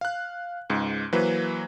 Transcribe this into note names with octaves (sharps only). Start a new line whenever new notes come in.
F5 F#6
C#2 G#2
E3 F#3 A#3 B4 C5